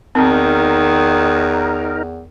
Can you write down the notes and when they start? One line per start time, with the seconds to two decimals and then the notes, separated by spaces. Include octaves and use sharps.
0.15 E2 D#3 C4 D#4 A#4